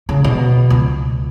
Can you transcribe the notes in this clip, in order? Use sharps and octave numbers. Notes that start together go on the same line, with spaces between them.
C#3
B2
C#2